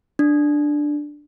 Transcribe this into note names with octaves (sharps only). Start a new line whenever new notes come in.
D4